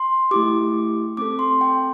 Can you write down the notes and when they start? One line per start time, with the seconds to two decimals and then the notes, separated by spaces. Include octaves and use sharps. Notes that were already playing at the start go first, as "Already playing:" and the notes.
Already playing: C6
0.31 A3 E4 G4 D6
1.17 C4 A4 D6
1.39 C6
1.61 G5